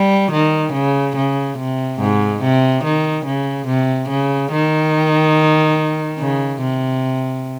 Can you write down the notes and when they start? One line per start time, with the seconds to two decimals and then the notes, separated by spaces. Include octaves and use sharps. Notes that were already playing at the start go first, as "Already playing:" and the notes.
Already playing: G3
0.32 D#3
0.73 C#3
1.16 C#3
1.58 C3
2.00 G#2
2.42 C3
2.84 D#3
3.26 C#3
3.67 C3
4.09 C#3
4.52 D#3
6.19 C#3
6.62 C3